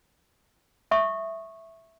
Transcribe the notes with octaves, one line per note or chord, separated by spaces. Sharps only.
E5 C#6 D#6